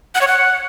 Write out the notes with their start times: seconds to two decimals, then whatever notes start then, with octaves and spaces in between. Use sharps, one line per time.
0.15 F#5
0.21 C#5
0.27 F#5